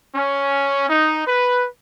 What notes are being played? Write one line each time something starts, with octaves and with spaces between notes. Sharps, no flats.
C#4
D#4
B4